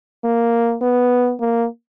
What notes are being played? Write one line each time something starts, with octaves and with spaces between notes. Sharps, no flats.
A#3
B3
A#3